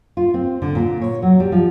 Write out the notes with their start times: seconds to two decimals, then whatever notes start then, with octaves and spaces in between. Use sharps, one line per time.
0.17 F4
0.34 C4
0.62 D3
0.75 A#2
1.01 C#5
1.22 F#3
1.40 G3
1.52 F3